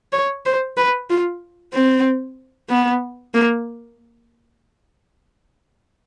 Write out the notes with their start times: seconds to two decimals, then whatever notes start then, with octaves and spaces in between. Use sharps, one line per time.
0.12 C#5
0.46 C5
0.77 B4
1.10 F4
1.73 C4
2.69 B3
3.34 A#3